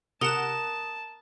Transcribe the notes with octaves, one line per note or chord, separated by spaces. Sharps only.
C3 A#4 F#5 A5 D#6 E7 G7